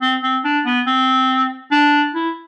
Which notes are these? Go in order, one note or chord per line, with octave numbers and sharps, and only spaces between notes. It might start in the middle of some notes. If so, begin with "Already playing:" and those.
C4
C4
D4
B3
C4
D4
E4